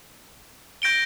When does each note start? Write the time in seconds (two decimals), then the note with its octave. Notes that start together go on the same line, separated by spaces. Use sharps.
0.82 G6 A#6 D7 G7